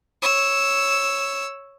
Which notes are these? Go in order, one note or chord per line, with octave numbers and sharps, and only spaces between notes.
C#5 E6